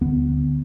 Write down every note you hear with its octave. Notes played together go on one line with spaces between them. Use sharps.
D2 D3 B3